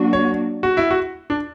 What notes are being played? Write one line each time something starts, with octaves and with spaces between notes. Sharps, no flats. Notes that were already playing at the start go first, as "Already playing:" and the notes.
Already playing: F#3 A#3 D4 F#4
C#5
F#4
E4
F#4
D4